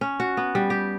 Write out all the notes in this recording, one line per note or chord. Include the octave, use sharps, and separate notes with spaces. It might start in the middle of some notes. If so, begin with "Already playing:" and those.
C#4
F#4
B3
G3
G4